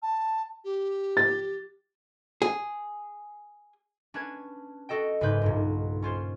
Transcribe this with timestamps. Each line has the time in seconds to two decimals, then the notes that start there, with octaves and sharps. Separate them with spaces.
0.02 A5
0.64 G4
1.17 A6
2.42 G#4
4.14 C#4 D4 B4 A5 G#6
4.89 F#4 A4 D#5 G5
5.21 F#1 G#2 G#4 B4 G6
5.42 B1 G2 A#2
6.02 C#4 F4 C5